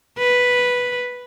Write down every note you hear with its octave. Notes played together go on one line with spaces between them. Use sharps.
B4